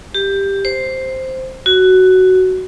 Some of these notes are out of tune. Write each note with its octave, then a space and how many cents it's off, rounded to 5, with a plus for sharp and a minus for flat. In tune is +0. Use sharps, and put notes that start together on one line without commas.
G4 +10
C5 +0
F#4 +10